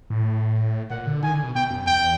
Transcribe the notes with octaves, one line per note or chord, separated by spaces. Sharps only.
A2
A#2 F#5
D3
D#3 G#5
D3
B2
B2 G5
F#2
E2 G5